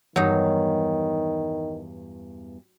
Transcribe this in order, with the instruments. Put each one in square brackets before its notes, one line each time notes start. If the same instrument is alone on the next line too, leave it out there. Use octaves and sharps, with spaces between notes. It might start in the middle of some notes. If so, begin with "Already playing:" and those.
[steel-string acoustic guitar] E2 G2 F5 [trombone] D#3 [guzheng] F#3 D#4